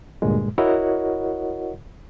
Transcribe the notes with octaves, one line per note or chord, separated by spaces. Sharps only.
D2 G2 A#2 G#3
E4 F#4 A#4 C#5 D#5 F#5